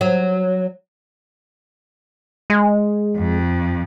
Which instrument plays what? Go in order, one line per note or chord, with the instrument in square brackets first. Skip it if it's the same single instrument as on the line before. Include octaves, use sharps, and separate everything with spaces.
[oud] F#3
[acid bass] G#3
[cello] F2